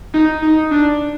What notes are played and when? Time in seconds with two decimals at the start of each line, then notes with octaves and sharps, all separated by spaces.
0.14 D#4
0.43 D#4
0.71 D4